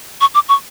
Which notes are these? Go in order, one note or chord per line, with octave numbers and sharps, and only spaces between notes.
C#6
D6
C#6